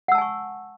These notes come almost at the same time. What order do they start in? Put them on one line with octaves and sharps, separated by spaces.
F#5 E6 A5 G#5 C#6